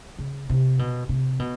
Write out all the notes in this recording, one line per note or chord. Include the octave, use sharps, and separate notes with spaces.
C#3
C3
B2
C3
B2